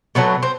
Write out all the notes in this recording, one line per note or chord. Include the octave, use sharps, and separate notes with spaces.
B2 F#3 A3 B3
C4